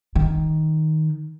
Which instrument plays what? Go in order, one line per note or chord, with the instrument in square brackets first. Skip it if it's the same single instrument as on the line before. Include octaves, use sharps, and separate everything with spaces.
[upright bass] D#3